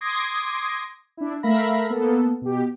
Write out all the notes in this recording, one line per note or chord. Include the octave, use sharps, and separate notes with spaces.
C6 D6 D#6 G#6 A#6
D4 E4
A3 A#4 E5 F5 B5 A#6
A#3 B3 A4
B2 G4